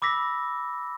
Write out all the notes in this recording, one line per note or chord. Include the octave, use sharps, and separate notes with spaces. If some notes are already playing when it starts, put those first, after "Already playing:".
B5 D6 E6 A#6 B6